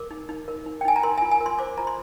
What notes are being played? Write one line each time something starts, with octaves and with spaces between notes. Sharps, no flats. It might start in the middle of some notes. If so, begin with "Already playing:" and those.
Already playing: A#4 D6
D#4
D#4
A#4
D#4
G5
D#4 G#5
A#5
A#4 C6
F4 G#5
G#5
A#4
C6
C5 D6
F4 A#5
C6